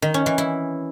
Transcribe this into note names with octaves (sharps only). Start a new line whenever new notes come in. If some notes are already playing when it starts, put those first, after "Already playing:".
D#3
C#4
E3
E4